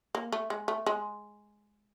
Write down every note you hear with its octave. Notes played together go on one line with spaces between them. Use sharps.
A#3
A3
G#3
A3
G#3